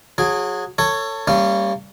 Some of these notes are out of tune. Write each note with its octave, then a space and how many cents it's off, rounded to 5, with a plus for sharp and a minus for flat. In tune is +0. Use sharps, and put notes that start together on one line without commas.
F#3 -25 G#4 +0
A4 +25 C#5 +0
G3 +10 A#3 -25 C#4 -10